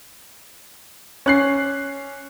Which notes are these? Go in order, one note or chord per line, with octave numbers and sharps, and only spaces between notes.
C#4 F#6 C7